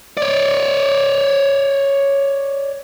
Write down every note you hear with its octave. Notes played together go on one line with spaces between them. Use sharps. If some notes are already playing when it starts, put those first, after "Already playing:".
C#5 D5